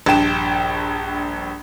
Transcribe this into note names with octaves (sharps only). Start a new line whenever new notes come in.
A#1 G2 G5 E7